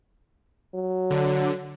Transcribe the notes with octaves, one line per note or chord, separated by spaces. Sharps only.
F#3
D3